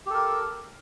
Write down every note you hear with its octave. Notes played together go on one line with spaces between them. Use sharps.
G4 A4 A#4